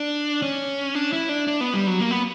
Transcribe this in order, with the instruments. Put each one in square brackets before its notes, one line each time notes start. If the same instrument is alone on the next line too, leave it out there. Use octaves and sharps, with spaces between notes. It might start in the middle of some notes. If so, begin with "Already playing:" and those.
Already playing: [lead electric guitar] D4
C#4
D4
E4
D4
D4
B3
G3
F#3
A#3
B3